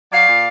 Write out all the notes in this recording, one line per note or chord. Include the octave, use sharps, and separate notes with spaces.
F#3 D5 F5
A#2